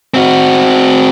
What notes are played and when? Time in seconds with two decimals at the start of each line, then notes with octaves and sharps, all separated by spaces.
0.14 C4 F#4